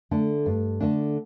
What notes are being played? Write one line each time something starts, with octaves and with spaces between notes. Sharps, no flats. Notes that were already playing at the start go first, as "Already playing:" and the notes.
D3 A3 D4
G2
D3 A3 D4